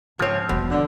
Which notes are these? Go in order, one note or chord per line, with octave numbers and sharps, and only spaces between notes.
C#2 G#2 F3 C4 C#5
E1 B2 G3
D3 E3